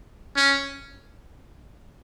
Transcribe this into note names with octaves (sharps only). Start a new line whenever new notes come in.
C#4